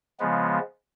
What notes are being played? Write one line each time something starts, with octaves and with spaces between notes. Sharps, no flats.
C#3 F3 G#3 B3